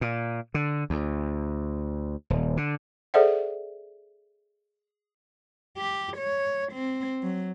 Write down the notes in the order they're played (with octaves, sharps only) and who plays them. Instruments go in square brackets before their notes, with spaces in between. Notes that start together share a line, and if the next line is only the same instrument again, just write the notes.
[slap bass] A#2
D3
D2
D#1
D3
[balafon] G#4 A4 C5 D5 E5 F#5
[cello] G4
C#5
C4
F#3